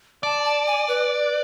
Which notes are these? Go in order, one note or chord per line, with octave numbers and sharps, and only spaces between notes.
D5 A5
A5
G#5
B4